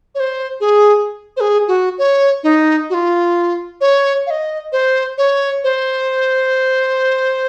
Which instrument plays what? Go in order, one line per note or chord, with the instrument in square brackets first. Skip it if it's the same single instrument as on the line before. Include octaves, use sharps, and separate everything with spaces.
[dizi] C#5
C5
G#4
C5
G#4
F#4
C#5
D#4
F#4
F4
C#5
F5
D#5
C5
C#5
C5